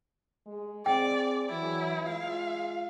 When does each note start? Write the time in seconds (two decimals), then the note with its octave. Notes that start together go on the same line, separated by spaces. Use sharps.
0.46 G#3
0.86 C4 G#4 D5 G5
1.50 E3 F#3 E4
2.07 G#3 F4 F5